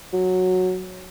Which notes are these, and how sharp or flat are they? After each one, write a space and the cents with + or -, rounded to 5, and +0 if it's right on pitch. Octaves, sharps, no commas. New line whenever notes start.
F#3 -10